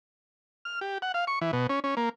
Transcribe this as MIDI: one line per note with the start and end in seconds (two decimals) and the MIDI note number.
0.65 0.80 89
0.81 0.98 67
1.02 1.12 78
1.14 1.25 77
1.27 1.39 85
1.41 1.51 52
1.53 1.67 47
1.69 1.80 61
1.84 1.95 61
1.97 2.09 58